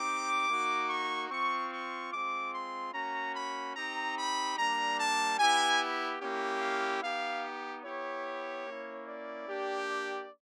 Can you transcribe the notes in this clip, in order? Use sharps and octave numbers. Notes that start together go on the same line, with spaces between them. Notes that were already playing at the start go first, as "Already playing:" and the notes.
Already playing: C4 D#4 G4 D6
A#3 D#4 F#4
C#6
C4 F4 C#6
C#6
G#3 C4 F4 D6
C6
A#3 C#4 F#4 A#5
B5
C4 D#4 G4 A#5
B5
G3 A#3 D4 A#5
A5
B3 E4 G4 G#5
A#3 C#4 E4 G4
F5
B3 D#4 G4 F5
B3 E4 G4 C#5
A#3 C#4 E4
D5
A#3 D4 G4
D5